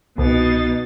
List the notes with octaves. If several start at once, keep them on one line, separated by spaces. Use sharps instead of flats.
C2 B2 D#4 A6